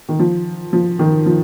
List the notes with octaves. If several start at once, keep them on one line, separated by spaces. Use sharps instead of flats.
D#3
F3
F3
D#3
F3